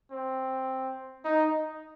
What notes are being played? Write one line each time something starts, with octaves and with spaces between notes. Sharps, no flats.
C4
D#4